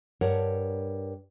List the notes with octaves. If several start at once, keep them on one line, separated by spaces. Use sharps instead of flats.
G2 A#4 C#5 F#5